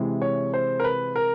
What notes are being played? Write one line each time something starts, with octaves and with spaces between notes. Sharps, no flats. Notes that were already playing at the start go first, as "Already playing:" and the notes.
Already playing: C3 E3 G#3
C#5
C5
A#4
B4
A#4